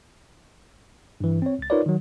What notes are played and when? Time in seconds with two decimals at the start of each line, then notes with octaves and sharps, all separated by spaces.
1.20 G2 E3
1.42 C4 C#5
1.59 C#2 A6
1.70 D#4 F4 A#4 B4 C#5 D5
1.86 D#3 F#3